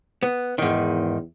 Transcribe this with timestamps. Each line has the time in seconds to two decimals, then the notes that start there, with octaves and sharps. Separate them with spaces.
0.23 B3
0.58 E2 G#2 D#3